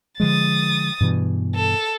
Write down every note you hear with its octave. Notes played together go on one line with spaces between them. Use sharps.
D3 F3 G#3 D#6 A6
G2 B2 E3
A4